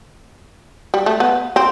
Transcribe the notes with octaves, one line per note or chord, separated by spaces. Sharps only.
G3
A3
B3
C4